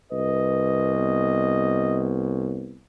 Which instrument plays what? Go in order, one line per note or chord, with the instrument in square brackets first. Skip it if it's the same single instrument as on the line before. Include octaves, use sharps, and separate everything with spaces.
[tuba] C2 [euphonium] B4 [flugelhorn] D#5
[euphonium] B3